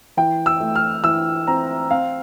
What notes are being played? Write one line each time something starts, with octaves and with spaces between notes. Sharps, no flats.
E3 G5
E6
A3
F6
E3 E6
C4 A#5
C4 F5